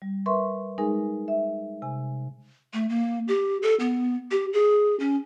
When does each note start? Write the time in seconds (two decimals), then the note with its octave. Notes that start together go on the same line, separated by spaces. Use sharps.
0.02 G3
0.26 A#4 B4 E5 C6 C#6
0.78 G#3 D#4 G#4 A#4 G#5
1.28 E5
1.82 C3 G#5
2.73 A3
2.89 A#3
3.28 G4
3.62 A4
3.80 B3
4.31 G4
4.53 G#4
5.00 C#4